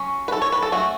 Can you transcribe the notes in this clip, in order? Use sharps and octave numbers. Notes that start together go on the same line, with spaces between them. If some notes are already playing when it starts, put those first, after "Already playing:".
Already playing: F#3 C#4
B4
A4
C#5
B4
A4
F#3 A3 C#4 F#4